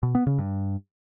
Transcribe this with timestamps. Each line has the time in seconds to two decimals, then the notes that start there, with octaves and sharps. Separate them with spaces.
0.03 B2
0.15 B3
0.27 C#3
0.39 G2